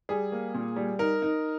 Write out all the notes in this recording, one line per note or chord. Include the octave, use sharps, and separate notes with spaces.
G3 G#4
A#3
A#2
G3
D#4 A#4
D#4